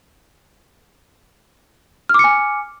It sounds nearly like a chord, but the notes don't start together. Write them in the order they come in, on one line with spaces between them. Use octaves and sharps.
F6 D6 C#7 G#5